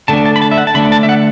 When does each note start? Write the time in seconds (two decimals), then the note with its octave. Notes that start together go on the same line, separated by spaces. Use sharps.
0.08 D3 A3 D4 A5
0.25 A5
0.36 B5
0.42 A5
0.51 E5
0.58 F#5
0.67 A5
0.75 D3 A3 D4 B5
0.92 A5
1.03 E5
1.09 F#5